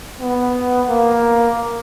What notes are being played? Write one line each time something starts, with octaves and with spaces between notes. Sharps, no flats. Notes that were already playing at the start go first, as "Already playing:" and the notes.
B3
A#3